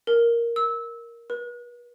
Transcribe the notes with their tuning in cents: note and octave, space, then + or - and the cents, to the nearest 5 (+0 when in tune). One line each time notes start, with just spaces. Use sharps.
A#4 +5
E6 -20
B4 -40